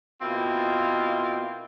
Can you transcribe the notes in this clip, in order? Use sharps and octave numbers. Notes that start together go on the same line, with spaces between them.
B2 A#3 C4 E4 F4